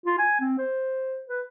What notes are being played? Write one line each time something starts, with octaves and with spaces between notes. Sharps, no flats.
F4
G#5
C4
C5
B4